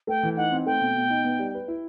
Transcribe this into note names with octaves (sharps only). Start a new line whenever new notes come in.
A3 G5
E3
D#4 F#5
C4
A3 G5
B2
B2
D#4
B3
G3
B4
E4